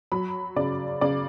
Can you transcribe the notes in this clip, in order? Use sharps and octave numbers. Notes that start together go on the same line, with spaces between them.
F#3 B5
C#3 D5
C#3 D5